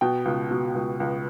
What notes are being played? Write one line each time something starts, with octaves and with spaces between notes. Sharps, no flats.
B2 G5
C#2
B2
C#2
C#2